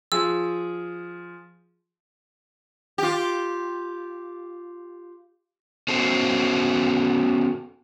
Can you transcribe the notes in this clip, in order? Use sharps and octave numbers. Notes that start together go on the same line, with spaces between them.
F3 G#4 E6
F4 G4
B3 C#4 F#4 A4 C5